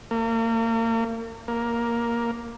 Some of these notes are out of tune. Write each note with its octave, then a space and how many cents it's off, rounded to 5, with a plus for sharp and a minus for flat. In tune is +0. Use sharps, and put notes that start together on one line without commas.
A#3 -35
A#3 +10